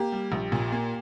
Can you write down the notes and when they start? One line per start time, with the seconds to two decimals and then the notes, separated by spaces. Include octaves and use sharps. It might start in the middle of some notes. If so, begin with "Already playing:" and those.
Already playing: A#3 G4
0.12 G3
0.32 A#1
0.52 A#2
0.72 A#3